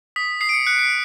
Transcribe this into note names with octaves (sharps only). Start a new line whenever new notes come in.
D#6 B6
D#6 C7
D7
C#7
F#6 C#7
C7